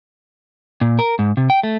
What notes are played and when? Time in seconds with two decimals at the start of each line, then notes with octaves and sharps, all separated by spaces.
0.81 A#2
0.99 A#4
1.19 G#2
1.37 C3
1.50 G5
1.63 A3